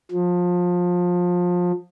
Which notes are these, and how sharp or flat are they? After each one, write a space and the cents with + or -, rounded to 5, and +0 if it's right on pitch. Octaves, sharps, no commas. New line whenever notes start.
F3 +25